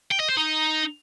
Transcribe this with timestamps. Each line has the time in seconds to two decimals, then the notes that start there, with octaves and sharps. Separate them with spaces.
0.11 G5
0.20 D#5
0.28 C5
0.37 D#4